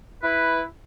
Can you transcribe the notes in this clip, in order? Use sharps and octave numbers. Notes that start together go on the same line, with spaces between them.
E4 B4